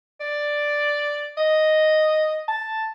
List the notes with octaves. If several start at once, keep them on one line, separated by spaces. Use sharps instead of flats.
D5
D#5
A5